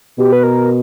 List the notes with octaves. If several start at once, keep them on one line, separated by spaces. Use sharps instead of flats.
B2 G4
B4
A#4